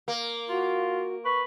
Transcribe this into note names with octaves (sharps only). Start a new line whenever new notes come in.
A#3
F4 F#4
B4 C#6